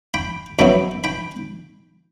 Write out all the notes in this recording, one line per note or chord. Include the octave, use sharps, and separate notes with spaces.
G5 B5
F#2 F#3 B3 E4 G5 B5
G5 B5